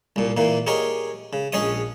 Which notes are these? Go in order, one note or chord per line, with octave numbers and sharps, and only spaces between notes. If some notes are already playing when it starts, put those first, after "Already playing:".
C2 A#2
A#2 E3 A#3
G4 G#4 A#4 C#5 D#5 G#5
C#3
A#1 C#4 G#4 C#5 D#5 D#6